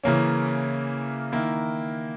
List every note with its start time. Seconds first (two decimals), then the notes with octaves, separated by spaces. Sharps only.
0.04 C#3 E3 A#3 C#4
1.32 D#3 A#3 E4